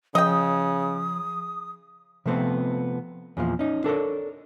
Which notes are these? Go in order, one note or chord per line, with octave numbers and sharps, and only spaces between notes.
C#3 F3 D#5 G5 D#6
C3 F3 A3 B3 C4
E2 A#2 F3
C#4 D#4
D4 A4 A#4 C#5